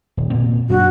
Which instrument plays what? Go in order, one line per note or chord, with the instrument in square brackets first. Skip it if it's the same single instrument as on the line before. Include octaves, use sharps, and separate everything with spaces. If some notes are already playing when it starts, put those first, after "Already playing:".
[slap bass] D#1
A#2 A#3 C4
[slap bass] F#2 C#4 D4 [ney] F#4